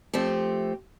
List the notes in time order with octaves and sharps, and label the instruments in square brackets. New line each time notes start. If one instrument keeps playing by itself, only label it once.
[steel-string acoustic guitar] F3 A3 C4 G4